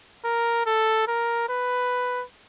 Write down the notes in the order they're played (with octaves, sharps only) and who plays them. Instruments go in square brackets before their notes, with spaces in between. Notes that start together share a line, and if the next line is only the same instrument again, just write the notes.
[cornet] A#4
A4
A#4
B4